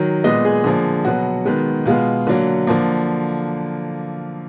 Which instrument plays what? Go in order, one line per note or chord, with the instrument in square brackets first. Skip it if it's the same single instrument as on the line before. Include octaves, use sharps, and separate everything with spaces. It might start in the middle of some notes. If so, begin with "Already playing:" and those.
Already playing: [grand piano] D#3 F#3
A#2 G#3 B3 D#5
G#4
D3 F3 A#3
B2 F#3 B3 F#4
D#3 G#3 B3
B2 G#3 B3 F4
D3 F#3 A#3
D3 F3 A#3